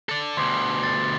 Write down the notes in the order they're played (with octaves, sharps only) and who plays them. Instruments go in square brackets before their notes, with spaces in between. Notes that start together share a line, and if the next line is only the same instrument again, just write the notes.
[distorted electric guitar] A4 D5
[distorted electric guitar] D2 B2 [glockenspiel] C6 D6
[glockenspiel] A6